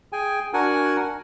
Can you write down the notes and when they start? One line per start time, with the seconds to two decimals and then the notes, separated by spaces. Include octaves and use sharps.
0.13 G#4 G5 G#5
0.53 D4 F#4 A#4 F#5 G#5